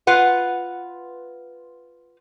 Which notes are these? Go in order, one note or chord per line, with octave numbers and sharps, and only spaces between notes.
F4 B4 F#5